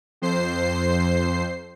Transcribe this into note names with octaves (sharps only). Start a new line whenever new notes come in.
F2 C5 C7